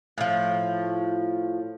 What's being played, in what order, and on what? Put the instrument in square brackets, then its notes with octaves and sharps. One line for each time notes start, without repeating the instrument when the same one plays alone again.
[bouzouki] A2 F3